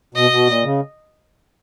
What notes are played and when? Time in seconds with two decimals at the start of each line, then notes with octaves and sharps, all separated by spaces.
0.15 B2 D#5
0.31 B2
0.47 A#2
0.64 C#3